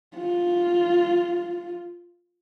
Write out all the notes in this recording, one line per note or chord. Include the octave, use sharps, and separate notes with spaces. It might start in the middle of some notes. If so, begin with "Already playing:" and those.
F4